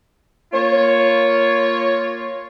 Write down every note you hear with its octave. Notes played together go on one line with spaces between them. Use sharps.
A#3 F4 C#5